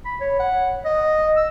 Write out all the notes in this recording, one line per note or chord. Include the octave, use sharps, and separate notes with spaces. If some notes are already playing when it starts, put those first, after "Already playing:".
B5
C#5
F#5
D#5
E6